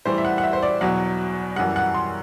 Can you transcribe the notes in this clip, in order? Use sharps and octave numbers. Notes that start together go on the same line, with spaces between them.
A2 E3 G3 C5
E5
F#5
F#5
E5
C5
D5
E2 B2 F#3 F#5
F#2 E3 G3 F#5
F#5
C6